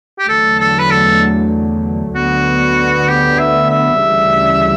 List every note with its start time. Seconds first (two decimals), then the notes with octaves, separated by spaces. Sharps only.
0.19 G4
0.28 E2 D3 F#3 A3 A4
0.60 A4
0.79 B4
0.91 A4
2.15 D2 D3 F#3 B3 F#4
3.08 G4
3.39 E5
3.70 E5
4.01 D2 C#3 E3 G3